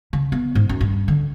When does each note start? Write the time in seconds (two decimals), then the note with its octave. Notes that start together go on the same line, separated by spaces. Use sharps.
0.13 C#3
0.32 B3
0.55 G#2
0.69 F#2
0.81 G2
1.08 D3